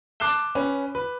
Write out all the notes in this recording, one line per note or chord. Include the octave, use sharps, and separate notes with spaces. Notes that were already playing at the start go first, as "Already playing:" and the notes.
A5 D6 F#6 C7 E7 G7
C#4 B4
B4